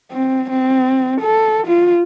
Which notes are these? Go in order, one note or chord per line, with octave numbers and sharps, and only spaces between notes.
C4
C4
A4
F4